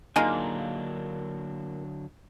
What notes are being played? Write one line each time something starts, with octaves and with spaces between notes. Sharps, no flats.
D3 F#3 G#3 A#3 D4 D#4 F4